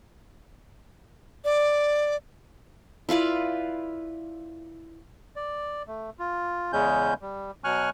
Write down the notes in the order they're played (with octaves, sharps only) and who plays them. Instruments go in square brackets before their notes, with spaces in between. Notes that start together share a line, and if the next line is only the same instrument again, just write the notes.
[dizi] D5
[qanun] E4 F4 B4 D5
[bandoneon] D5
A3
F4
E2 C#3 G#3 C#4 G6
G3
B2 F#3 G#5 C#6 F6 F#6